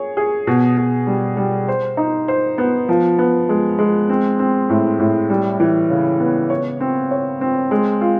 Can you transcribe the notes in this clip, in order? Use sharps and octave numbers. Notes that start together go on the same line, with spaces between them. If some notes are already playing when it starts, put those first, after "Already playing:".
Already playing: G#4 C#5
G#4
B2
B2
G3
G3
C5
D#4
C5
B3
F3
B3
G#3
G#3
C4
C4
A2
A2
G3
E3
C#3
B3
C#5
C4
C#5
C4
G#3
F4